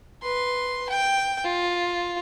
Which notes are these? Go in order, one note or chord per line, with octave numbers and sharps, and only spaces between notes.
B4 C6
G5
F4